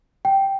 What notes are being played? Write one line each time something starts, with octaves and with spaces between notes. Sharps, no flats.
G5